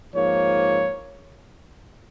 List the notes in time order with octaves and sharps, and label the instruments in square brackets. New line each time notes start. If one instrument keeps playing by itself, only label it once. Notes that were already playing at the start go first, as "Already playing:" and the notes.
[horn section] G#2 F3 A#3 C#5